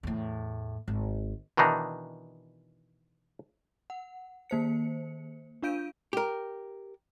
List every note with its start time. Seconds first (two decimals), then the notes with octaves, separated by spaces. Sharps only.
0.03 E2 A2
0.88 G#1
1.57 B2 D#3 E3 D4 D#4
3.90 F#5
4.50 D#3 A#3 C5 C#7
5.63 D4 F4 F5 G6 D7 D#7
6.13 G4 A#4